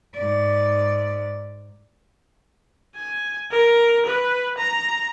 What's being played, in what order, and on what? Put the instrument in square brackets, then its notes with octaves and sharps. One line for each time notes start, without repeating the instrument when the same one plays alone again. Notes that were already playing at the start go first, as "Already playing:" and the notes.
[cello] G#2 D5
[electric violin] G#5
A#4
B4
A#5